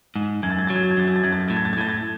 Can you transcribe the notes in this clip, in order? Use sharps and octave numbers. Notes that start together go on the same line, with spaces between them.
G#2
F#2 G#6
A6
G#6
F#3 A6
G#6
A6
G#6
F#2 A6
G#6
A6
F#2 G#6
A6
G#6
A2 A6
G#6
A6
G#6
A2 A6
G#6